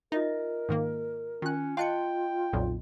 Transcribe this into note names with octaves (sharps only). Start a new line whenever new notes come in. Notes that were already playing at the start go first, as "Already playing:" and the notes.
D#4 F4 A#4 D#5 E5
G#2 D#3 A#3
D#3 C#4 F4 F#6
F4 D#5 F5 G5 A5 C6 F#6 C#7
B1 F2 A#2